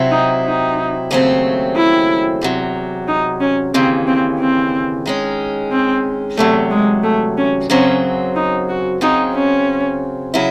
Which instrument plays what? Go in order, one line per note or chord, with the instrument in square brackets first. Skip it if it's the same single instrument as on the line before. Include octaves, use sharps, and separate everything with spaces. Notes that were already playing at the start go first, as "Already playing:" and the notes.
Already playing: [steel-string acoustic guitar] C3 F#3 C4 E4
[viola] D#4
D#4
[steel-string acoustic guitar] D#2 C#3 F#3 A3 C4
[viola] E4
[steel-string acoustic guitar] E2 C3 F#3
[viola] D#4
C#4
[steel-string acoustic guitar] D#2 C#3 E3 [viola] C4
[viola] C4
C4
[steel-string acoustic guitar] D#3 G#3 C#4
[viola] C4
[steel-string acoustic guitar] E2 C3 F#3 [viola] A3
[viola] G#3
A3
C#4
[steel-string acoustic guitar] F#2 C#3 F#3 C4 [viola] C#4
[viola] D#4
F#4
[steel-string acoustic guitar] C#3 F#3 C4 [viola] D#4
[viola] C#4
[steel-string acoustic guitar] C#3 F#3 C#4 E4